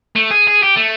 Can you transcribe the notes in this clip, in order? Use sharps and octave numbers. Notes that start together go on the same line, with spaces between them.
A3
G#4
G#4
G4
A3